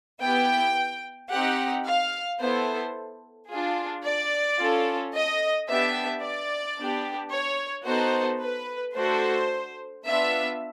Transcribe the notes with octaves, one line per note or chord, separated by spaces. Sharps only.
B3 E4 G4 G5
C4 D#4 G4 F#5
F5
B3 E4 A4 C5
D4 F4 G#4
D5
C#4 F4 A4
D#5
B3 D4 G4 E5
D5
B3 D4 G4
C#5
B3 D#4 F#4 A4 C5
B4
A3 D4 F#4 A4 C5
B3 D4 F4 E5